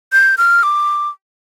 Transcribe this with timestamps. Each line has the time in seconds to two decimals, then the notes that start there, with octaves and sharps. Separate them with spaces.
0.12 G6
0.38 F6
0.63 D6